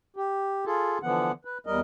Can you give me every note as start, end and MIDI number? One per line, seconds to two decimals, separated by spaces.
0.16 0.65 67
0.66 0.98 65
0.66 0.98 68
0.66 0.98 69
1.03 1.32 50
1.03 1.32 52
1.03 1.32 53
1.03 1.32 59
1.03 1.32 78
1.45 1.58 71
1.67 1.80 40
1.67 1.80 55
1.67 1.80 70
1.67 1.80 75